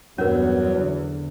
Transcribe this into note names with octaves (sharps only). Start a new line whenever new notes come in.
E2 G2 F#3 C#4 A#4
D3